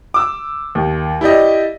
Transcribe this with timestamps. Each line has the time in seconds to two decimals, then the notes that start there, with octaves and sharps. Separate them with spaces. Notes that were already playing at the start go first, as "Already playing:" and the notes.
0.14 D6 E6
0.75 D#2
1.21 E4 G4 D5 D#5